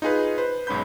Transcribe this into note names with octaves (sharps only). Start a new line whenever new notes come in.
D#4 F4 G#4 B4
B4 C5
B1 G#2 C#4 B5 G6